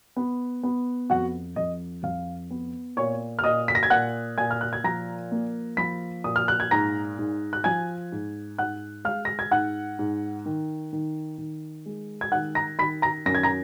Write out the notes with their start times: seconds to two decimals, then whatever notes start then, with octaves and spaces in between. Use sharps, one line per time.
0.16 B3
0.63 B3
1.10 F2 F#4 F#5
1.56 F2 D#5
2.03 F2 F5
2.51 B3
2.97 A#2 C#5 C#6
3.39 F6
3.44 A#2 D#5 D#6
3.68 B6
3.75 A#6
3.83 G#6
3.90 A#2 F#5 F#6
4.38 A#2 G#5 G#6
4.51 F6
4.61 F#6
4.73 G#6
4.84 F3 A#5 A#6
5.32 A#3
5.77 F3 B5 B6
6.24 A#2 D#6
6.36 F6
6.48 F#6
6.60 G#6
6.71 G#2 A#5 A#6
7.19 G#2
7.53 F#6
7.64 F3 G#5 G#6
8.12 G#2
8.58 G#2 F#5 F#6
9.04 G#3 F5 F6
9.25 A#6
9.39 G#6
9.51 G#2 F#5 F#6
9.99 G#2
10.46 D#3
10.93 D#3
11.38 D#3
11.86 G#3
12.21 G#6
12.32 D#3 F#5 F#6
12.55 A#5 A#6
12.79 D#3 B5 B6
13.02 A#5 A#6
13.26 F#2 A#6
13.35 G#6
13.43 A#5 A#6